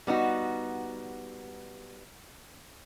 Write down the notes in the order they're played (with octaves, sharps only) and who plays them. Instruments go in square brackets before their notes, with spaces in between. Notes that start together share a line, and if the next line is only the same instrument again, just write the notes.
[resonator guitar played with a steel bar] G3 B3 D#4 F#4